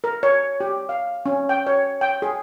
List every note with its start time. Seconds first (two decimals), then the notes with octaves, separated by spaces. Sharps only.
0.04 A#4
0.23 C#5
0.60 G4
0.89 F5
1.26 C#4
1.49 G5
1.67 C#5
2.01 G5
2.22 G#4